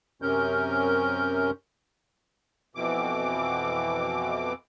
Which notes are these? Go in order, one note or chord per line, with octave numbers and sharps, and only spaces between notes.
F#2 C3 C#4 A#4 G6
F2 B2 E3 D6